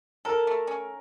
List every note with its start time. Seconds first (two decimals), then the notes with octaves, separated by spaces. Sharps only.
0.25 A4 A#4
0.47 A3
0.67 C#4